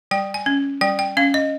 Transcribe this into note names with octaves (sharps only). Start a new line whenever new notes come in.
G3 G5
G#5
C#4
G3 G5
G5
C#4 F5
D#5